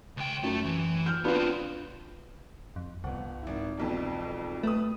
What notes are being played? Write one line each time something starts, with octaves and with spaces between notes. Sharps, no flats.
C#2 G5
F#2 A3
E3
F6 G6
B3 C4 D4 F4 B4
F2
G1 C2 F#5
G#1 E4
E1 B1 F2
A3 B4 D#6